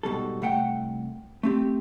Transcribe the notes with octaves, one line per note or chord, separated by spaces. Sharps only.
G#2 B2 G3 A4
C2 A3 F#5 G5
A3 C4 G4